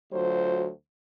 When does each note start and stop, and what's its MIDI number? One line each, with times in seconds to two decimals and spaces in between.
0.11 0.68 38
0.11 0.68 54
0.11 0.68 65
0.11 0.68 72